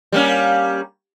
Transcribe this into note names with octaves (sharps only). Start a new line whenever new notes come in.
G3 A#3 C#4